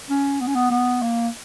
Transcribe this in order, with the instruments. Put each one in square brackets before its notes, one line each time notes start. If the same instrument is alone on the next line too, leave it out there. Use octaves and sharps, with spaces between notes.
[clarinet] C#4
B3
C#4
B3
B3
A#3